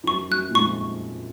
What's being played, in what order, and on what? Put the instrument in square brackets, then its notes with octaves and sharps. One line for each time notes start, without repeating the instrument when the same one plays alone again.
[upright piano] F2
[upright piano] F#2 [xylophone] C#6
[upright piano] F#2 [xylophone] F#6
[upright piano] A#2
[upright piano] F2 G#2 [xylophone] C#6